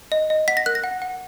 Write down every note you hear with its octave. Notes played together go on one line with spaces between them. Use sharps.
D#5
D#5
F#5 B6
A#6
A#4 F#6
A#6
F#5
F#5